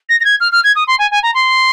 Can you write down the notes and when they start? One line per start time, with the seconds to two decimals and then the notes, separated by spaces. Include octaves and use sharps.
0.09 A#6
0.20 A#6
0.25 G#6
0.40 F6
0.52 F6
0.64 G#6
0.76 D#6
0.87 C6
0.99 G#5
1.11 G#5
1.23 A#5
1.34 C6